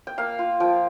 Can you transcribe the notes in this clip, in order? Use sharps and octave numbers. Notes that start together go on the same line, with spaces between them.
G5
A#3 F5
F4
F3 G5